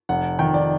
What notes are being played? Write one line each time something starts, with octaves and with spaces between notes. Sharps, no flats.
F1 F#5
D#3 G5
D5